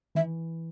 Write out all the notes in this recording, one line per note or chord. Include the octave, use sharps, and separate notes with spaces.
E3 E5